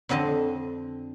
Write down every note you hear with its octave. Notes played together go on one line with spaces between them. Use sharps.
F2 D3 C4 D#5 A5